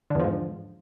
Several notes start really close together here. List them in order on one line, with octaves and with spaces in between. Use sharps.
D3 E2 F3 G#2